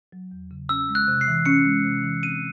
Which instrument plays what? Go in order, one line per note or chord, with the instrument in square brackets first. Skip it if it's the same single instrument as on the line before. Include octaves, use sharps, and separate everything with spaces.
[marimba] F#3
E2
C#3
[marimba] C#4 [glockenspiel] E6
[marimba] G#3
[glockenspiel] F#6
[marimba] C3
[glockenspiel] C7
[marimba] E3
[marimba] C#4 [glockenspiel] C#7
[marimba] G#3
C3
E3
[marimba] C4 [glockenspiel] D#7